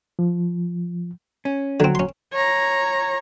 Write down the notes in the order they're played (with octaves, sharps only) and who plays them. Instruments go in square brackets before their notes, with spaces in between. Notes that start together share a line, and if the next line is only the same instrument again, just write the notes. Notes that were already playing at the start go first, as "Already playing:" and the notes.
[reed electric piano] F3
[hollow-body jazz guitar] C#4
[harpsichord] D3 C4 [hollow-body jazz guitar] F#3
[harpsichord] C#4 C6
[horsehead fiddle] C#5 A#5